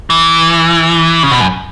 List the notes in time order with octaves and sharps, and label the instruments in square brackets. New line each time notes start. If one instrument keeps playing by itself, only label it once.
[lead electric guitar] E3
C#3
B2
F#2